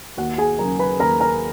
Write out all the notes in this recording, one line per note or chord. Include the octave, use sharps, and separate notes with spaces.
D#2 F#4 F#5
G#4 G#5
C#3 F#3 A#4 A#5
B4 B5
D#2 A#4 A#5
A#4 A#5